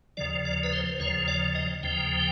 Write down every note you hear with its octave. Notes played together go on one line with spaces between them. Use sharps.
D#2 C#3 F3 D5
D5
B4
C5
D#2 C#3 F3 C#5
D5
D#5
D#2 C#3 F3 G5